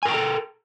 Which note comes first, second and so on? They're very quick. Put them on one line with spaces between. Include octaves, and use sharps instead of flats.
G#5 A#4 G5 A#5 A4